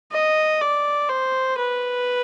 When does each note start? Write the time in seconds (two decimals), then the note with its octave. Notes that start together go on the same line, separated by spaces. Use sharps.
0.12 D#5
0.61 D5
1.09 C5
1.58 B4